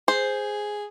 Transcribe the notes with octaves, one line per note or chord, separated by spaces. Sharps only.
G#4 C5